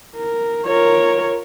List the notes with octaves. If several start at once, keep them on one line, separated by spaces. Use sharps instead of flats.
A#4
F4 A#4 C#5